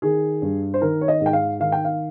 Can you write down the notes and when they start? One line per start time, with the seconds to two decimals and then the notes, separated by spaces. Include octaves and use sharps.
0.02 D#3 G#4
0.42 G2
0.74 C5
0.81 D#3 A#4
1.01 C#5
1.08 D#5
1.21 G#2
1.26 G5
1.33 F5
1.60 D#3 F5
1.72 G5
1.85 F5